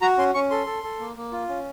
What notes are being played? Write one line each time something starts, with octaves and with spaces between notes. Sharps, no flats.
F#4 A#5
C#4 C6
C#4 C#6
A4 C6
A4
A4
A#3
A#3
F4
C#4